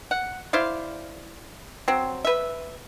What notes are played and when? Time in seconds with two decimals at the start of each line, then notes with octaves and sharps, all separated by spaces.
0.11 F#5
0.53 E4 C5 D5 F5
1.88 F#3 C4
2.25 B4 E5